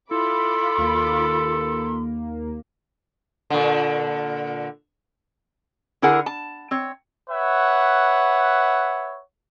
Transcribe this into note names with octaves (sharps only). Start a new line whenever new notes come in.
E4 F4 A4 B5 C6 D6
D#2 A#3
A#2 D3
D3 E4 G#4 A#4 F#5
A5
C4 C#5
B4 C#5 E5 F#5